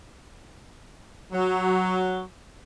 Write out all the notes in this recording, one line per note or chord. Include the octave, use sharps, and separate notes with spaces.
F#3